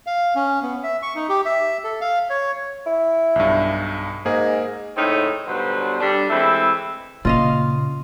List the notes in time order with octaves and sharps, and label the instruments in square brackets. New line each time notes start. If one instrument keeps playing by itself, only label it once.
[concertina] F5
C#4
B3
E5
C#6
D#4
G4
E5
A4
F5
C#5
[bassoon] E4
[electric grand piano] B1 G2
[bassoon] G#2 [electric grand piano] A#3 G#4 A#4
[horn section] A2 C#3 C4 D#4 C#5
B2 D3 F#3 G3 B4 C5
G3 D4 A4
E3 G#3 A3 C4 E4
[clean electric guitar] A#2 C#3 [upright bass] A#3 [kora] F4 D#5 F5